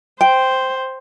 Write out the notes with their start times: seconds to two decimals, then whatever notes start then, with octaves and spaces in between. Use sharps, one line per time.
0.21 C5 G5